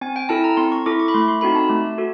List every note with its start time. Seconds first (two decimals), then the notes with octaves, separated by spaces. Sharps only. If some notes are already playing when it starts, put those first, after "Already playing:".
0.01 C4 G#5
0.16 G5
0.29 E4 A4 A5
0.44 A#5
0.57 C4 C6
0.72 C#6
0.86 E4 A4 D6
0.99 C#6
1.08 B5
1.14 A3 C6
1.28 C6
1.41 C4 D#4 F#4 A4 B5
1.55 A5
1.69 A3
1.98 F#4 A4